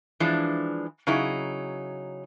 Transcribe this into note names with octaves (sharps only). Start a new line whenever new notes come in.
E3 F3 G#3 D4
C#3 F#3 D#4 E4 G#4